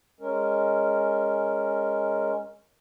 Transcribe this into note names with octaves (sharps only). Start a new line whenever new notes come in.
G#3 C#4 A#4